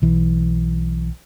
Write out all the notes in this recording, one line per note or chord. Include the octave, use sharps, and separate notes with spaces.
B1 E3